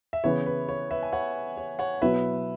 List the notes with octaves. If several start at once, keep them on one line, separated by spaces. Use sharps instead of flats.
E5
C#3 E3 B3 E4 C#5
B4
C#5
B4 E5
G#5
C#5 F#5
C#5
C#5 F#5
B2 F#3 E4 B4 E5